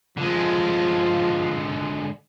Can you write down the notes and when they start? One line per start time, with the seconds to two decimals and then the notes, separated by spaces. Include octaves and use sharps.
0.18 D3 F3 G#3